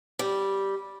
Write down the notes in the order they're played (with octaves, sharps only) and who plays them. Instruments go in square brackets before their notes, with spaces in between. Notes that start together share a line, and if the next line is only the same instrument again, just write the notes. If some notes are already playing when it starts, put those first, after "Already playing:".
[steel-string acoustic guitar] G3